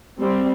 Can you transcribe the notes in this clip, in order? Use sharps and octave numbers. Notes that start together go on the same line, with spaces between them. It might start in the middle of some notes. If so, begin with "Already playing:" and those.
G3 C4